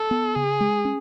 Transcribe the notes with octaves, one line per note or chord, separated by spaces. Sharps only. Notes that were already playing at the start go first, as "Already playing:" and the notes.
Already playing: A4
B3
C#3 G#4
G#3
C#4